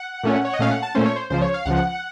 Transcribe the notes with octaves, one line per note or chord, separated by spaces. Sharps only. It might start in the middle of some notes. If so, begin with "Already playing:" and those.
Already playing: F#5
A#2 A3 C#4
C#5
D#5
A#2 A3 C#4 F5
F#5
A5
A#2 A3 C#4 C5
C#5
C5
C#2 C#3 F3 C5
C#5
F5
C#2 C#3 F3 F#5